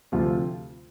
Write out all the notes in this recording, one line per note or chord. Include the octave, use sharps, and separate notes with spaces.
D2 C3 F3 C4 F4